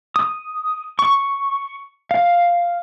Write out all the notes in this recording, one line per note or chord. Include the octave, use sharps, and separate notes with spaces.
D#6
C#6
F5